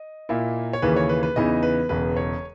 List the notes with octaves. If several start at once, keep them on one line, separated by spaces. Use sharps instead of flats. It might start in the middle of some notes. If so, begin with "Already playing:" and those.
Already playing: D#5
A#2 A#3 E4
C#5
D#2 C#3 E3 A#3 C#4 B4
C#5
B4
B4
E2 C#3 E3 B3 D#4 D#5
B4
E1 E2 C#3 B4
C#5